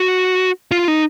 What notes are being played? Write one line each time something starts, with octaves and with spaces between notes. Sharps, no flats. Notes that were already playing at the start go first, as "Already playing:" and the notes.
Already playing: F#4
F4
D#4